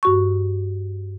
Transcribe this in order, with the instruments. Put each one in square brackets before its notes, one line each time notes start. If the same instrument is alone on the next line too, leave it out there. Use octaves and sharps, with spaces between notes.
[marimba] G2 F#4 C#6